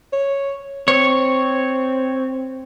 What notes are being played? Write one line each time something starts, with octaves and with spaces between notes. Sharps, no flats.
C#5
C4 C#5